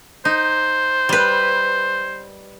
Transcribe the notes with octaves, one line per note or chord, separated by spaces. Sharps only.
D#4 C5
G3 B4